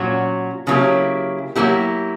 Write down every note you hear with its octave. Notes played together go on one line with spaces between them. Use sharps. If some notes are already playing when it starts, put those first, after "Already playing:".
Already playing: A#2 F#3 C#4 F#4
C#3 F#3 A#3 E4 G4
F#3 A#3 E4 G4